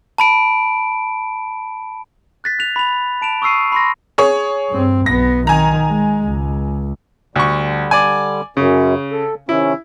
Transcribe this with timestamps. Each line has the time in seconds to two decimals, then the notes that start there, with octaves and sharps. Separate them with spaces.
0.18 A5 B5 D7
2.44 F#6 A6 B6
2.59 F#6 F7
2.76 B5 F7
3.22 A5 D7 E7 F7
3.42 C#6 D#6 E6 C7 D#7
3.72 B5 C6 A#6
4.18 G#4 C#5
4.70 G2 C4
5.06 B1 B3 A#6
5.47 D#3 G#5 A#5
5.88 G#3
6.25 C#2
7.36 D2 D3 G3 C#6
7.91 D5 G#5
8.57 F#2 C#3
9.12 A4
9.49 C3 D#3 C#4 E4